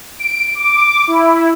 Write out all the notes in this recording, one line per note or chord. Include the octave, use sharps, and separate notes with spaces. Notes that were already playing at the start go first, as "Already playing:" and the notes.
D7
D6
E4